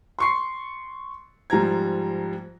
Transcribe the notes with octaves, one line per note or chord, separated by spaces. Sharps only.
C6 C#6 C7
G#2 F3 G3 A#5 G#6